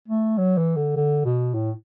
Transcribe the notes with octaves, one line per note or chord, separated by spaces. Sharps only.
A3
F#3
E3
D3
D3
B2
A2